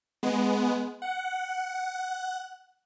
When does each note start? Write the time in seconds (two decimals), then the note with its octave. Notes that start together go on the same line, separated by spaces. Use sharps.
0.23 G#3 B3
1.02 F#5